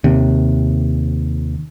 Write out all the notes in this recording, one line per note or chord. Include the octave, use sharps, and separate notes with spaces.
D#2 C3